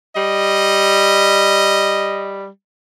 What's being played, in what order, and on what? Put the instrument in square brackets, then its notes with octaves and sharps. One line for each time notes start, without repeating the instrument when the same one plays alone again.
[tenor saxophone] G3 [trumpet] D#5